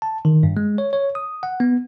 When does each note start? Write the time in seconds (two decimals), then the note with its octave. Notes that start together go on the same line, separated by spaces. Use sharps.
0.02 A5
0.25 D#3
0.43 G2
0.57 G#3
0.78 C#5
0.93 C#5
1.15 D#6
1.43 F#5
1.60 B3